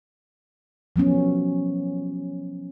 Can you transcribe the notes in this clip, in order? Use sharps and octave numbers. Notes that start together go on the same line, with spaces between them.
F3 F#3 B3 C#4